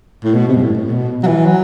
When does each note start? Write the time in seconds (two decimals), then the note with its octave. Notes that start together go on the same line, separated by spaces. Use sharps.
0.24 A2
0.34 B2
0.48 C3
0.56 G2
0.62 A2
0.76 A2
0.90 B2
1.23 F#3
1.27 E3
1.46 F#3